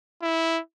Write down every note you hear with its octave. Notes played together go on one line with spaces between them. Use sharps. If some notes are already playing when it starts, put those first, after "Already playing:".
E4